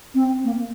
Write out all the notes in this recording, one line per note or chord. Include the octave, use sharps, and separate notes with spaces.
C4
A#3